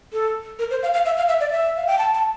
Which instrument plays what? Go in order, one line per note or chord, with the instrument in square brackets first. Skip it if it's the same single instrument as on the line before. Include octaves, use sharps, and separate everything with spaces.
[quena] A4
A#4
C5
F5
F5
E5
F5
E5
D5
E5
F5
G5
A5
A5